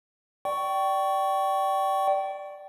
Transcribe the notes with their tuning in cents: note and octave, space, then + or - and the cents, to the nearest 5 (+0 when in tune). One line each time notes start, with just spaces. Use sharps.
D5 +0 G5 -25 C#6 +5